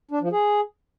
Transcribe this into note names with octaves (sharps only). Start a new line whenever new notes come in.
D4
F3
G#4